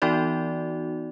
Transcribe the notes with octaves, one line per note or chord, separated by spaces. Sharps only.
E3 B3 D#4 F#4 D5